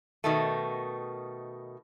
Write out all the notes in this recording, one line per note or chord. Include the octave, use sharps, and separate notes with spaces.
B2 D#3 A3